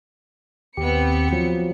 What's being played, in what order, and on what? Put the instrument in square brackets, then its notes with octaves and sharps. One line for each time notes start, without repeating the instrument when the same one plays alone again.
[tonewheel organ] D#2 G4 [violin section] B3 C4 C#7
[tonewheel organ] F3 F#3